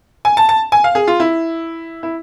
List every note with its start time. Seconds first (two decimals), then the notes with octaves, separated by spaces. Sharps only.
0.25 G#5
0.37 A5
0.49 A5
0.72 G#5
0.84 F5
0.95 G#4
1.08 F4
1.20 E4
2.03 E4